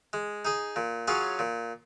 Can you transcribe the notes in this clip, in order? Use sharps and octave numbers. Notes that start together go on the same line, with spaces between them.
G#3
D#4 G#4
A#2
F#3 C#4 F4 G#4
A#2